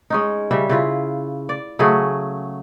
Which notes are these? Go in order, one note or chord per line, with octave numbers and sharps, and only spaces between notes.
G#3 C#4 D#4
C#3 G3 E5
C#3 E4 F4
D5
C#3 F#3 A3 G#4